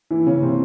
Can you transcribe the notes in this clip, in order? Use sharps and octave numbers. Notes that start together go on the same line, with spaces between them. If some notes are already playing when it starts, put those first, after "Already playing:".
E3 E4
C#3 C#4
C3 C4